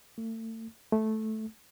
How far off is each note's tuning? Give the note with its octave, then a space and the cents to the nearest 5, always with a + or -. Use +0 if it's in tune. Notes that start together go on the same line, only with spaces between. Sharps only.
A3 +35
A3 -10